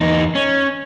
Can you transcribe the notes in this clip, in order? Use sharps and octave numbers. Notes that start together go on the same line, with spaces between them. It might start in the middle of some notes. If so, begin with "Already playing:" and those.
E2 D#4
C#4